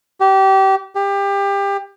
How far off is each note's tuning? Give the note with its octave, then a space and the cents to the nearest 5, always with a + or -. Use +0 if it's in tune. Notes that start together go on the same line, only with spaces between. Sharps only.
G4 -25
G4 +25